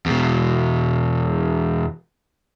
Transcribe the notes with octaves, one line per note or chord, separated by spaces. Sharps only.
E2 B2